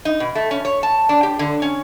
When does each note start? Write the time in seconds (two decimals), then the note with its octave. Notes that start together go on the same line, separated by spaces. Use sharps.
0.05 D#4
0.20 B2
0.35 A3
0.51 C#4
0.65 C#5
0.83 A5
1.09 D4
1.23 G4
1.39 D3
1.62 C#4